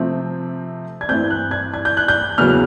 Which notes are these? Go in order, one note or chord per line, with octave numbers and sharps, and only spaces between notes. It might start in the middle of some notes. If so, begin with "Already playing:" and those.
Already playing: C3 F3 A3 C4
G#6
G2 E3 A3 C4 G6
F#6
G#6
G#6
G6
F#6
G6
E2 C#3 F#3 B3 F6